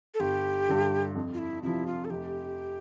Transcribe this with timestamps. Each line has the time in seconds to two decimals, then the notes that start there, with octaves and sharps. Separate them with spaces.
0.14 A4
0.20 G1 G4
0.68 G2 D3
1.15 F2
1.34 F4
1.38 E4
1.63 C3 F3 E4
1.87 F4
2.05 A4
2.10 F1 G4